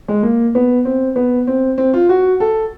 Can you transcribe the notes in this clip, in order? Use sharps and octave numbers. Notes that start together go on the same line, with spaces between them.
G#3
A#3
B3
C4
B3
C4
C4
F4
F#4
A4